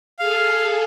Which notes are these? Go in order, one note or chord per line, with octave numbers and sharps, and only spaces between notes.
G#4 A4 F5